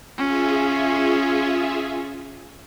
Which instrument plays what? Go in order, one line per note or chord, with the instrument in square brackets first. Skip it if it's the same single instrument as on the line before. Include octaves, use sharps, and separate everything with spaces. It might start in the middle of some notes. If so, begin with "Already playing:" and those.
[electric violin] C#4 [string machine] F4 G#4 E5